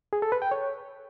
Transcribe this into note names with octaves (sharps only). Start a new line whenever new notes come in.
G#4
A4
B4
G5
C#5